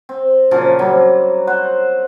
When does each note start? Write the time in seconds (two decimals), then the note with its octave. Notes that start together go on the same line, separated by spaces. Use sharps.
0.09 C4
0.51 A#2 C#3 F3 F#3
0.79 F#3 G3 C4
1.47 C5 F#5